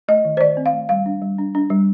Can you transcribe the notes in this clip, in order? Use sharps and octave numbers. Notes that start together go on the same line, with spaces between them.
A3 D#5
D#3
C5
D#3 D5
C4
F5
A3
G3 F5
D4
G3
D4
D4
G3